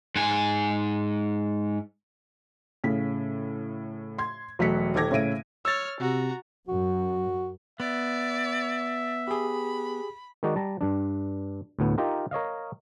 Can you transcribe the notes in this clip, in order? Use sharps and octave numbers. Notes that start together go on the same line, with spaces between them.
G#2 G#5
A2 C#3 B6
C6 G#6
E1 F#3 A3 F#6 B6 C#7
D#1 D#3 A4 D6 G#6 A#6
A2 C#3 C#5 E5 D7 D#7
C#5 E6 F6 A6
C3 F#4 A#5
F#2 F#4
B3 D5 E5
G4 G#4 B5
D#3 G#3 D#4 F#4 D5
G3 A5 A#5
G2 D4
D2 A2 B3
D#4 F4 G4 A#4
A#4 C#5 D#5 F5